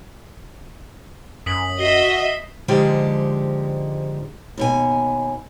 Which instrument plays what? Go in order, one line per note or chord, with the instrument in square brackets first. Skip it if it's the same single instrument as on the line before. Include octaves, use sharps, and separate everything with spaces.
[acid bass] F#2 [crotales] D#6 B6 F#7
[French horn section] F#4 [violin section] D#5 E5 [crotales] C7 G7
[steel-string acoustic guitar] G#2 D3 F3 G#3 G4
D#2 B2 G#5